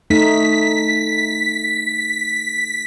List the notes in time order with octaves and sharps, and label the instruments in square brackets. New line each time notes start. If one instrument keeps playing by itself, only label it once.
[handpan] A3 D#4 [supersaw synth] B6